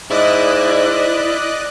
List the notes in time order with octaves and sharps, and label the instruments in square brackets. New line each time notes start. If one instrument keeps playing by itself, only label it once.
[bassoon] G#2 [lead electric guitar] E4 [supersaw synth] D5 D#5 F#6